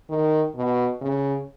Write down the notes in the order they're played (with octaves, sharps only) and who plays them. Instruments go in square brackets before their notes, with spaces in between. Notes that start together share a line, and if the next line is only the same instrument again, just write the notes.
[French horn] D#3
B2
C#3